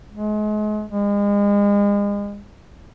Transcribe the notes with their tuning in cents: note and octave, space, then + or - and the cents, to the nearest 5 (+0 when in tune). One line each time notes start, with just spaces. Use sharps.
G#3 +35
G#3 -35